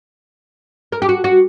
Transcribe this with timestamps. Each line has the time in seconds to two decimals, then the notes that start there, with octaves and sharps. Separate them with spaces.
0.92 A#4
1.02 G4
1.09 F#4
1.24 F#4